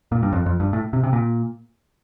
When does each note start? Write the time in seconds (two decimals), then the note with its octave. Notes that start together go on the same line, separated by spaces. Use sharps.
0.12 A#2
0.23 G2
0.33 F2
0.46 F2
0.60 G2
0.73 A2
0.93 C3
1.04 C3
1.13 A#2